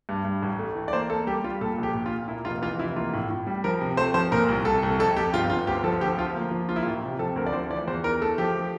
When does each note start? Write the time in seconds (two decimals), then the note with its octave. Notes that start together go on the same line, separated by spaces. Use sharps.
0.09 G2
0.25 G2
0.42 A1
0.59 A3
0.75 E3
0.88 D5
0.93 A#3 C5
1.09 A#3 A4
1.27 G3 G4
1.44 G3 F4
1.61 A#2 A4
1.78 A#1
1.83 G4
1.94 A#2
2.06 F4
2.11 A#2
2.28 A#3 E4
2.45 F1 F4
2.62 E3 F4
2.79 F1 E4
2.96 A#3 F4
3.13 A2
3.30 A2
3.47 G3
3.64 F3 A#4
3.81 C3
3.97 A3 C5
4.14 F3 C5
4.32 A#2 A#4
4.48 C2
4.65 C2 A4
4.83 C2
4.99 F2 A4
5.16 F2 G4
5.33 G1 F4
5.50 G1 F4
5.67 D2 G4
5.84 F3 A4
6.01 D2 G4
6.18 F3 F4
6.35 A#3
6.51 F3
6.69 A#3 F4
6.76 E4
6.83 F4
6.86 A1
7.03 C3
7.19 F3 A4
7.36 D2 A#4
7.46 D5
7.53 F3 C5
7.70 E3 D5
7.88 E2 C5
8.04 E3 A#4
8.21 A3 A4
8.38 F3 G4